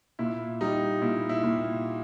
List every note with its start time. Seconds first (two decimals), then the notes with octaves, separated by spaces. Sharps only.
0.19 A#2 E4
0.61 G3 D#4
1.01 A#2 E4
1.29 E4
1.43 A#2